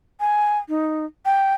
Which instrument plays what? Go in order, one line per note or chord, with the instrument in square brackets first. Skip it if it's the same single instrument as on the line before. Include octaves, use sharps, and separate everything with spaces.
[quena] G#5
D#4
G5